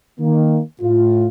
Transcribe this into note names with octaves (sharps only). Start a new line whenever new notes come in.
D#3 A#3
A2 F4